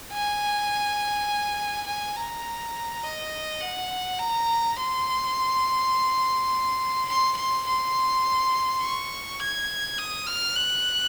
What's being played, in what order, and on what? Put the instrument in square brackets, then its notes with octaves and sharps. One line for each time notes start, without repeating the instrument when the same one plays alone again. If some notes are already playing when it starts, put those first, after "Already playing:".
[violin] G#5
G#5
A#5
D#5
F#5
A#5
C6
C6
C6
C6
C#6
G#6
D#6
F6
F#6